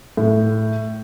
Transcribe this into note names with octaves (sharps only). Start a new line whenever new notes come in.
A2